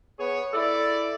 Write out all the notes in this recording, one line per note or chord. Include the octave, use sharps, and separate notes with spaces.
B3 G#4 C#5
E4 A4 D5